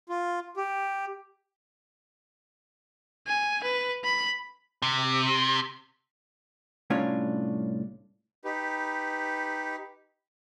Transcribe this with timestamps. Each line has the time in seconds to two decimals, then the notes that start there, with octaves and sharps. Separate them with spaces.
0.09 F4
0.57 G4
3.27 G#5
3.63 B4
4.04 B5
4.82 C3
6.90 C2 A2 C#4 D4 F4 C#5
8.45 D#4 G4 B4